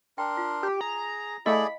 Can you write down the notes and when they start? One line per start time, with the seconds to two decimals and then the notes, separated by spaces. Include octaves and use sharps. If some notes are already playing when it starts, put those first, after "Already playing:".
0.18 D4 A#4 G5 C6
0.37 F4
0.63 G4
0.81 G#4 A#5
1.46 A3 E4 G#4 D5 D#5 F5 G#5 B5